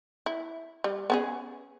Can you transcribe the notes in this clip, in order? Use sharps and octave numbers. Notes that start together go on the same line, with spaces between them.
E4
G3
B3 C#4 G#4